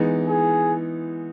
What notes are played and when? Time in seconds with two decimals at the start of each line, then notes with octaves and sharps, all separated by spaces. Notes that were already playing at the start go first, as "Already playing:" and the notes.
Already playing: E3 G#3 B3 D#4
0.29 G#4